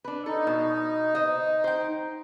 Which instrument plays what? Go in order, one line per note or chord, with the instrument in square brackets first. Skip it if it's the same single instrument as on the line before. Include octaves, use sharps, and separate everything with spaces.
[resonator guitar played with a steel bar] D4 B4
[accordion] D#4 [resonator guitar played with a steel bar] A4
[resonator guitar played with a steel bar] B2
C5 D#5
C5 G5